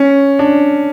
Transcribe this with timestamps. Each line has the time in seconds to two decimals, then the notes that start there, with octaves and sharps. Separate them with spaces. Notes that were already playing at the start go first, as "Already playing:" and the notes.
Already playing: C#4
0.39 D4